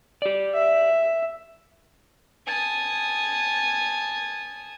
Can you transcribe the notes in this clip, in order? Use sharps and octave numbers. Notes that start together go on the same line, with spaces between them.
G4 D5
E5
G#5 A5 D#6